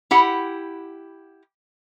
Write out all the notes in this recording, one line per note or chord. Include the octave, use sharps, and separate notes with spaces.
E4 G4 F#5